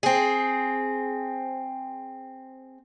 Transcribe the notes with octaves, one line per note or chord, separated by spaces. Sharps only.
C4 G#4